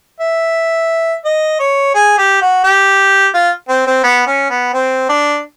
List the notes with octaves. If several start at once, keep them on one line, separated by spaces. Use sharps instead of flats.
E5
D#5
C#5
G#4
G4
F#4
G4
F4
C4
C4
B3
C#4
B3
C4
D4